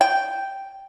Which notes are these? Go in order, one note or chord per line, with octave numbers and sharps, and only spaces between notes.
G5